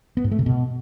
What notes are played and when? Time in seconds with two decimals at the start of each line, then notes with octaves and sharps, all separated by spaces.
0.17 B3
0.24 G#2
0.31 A3
0.39 C3
0.46 B2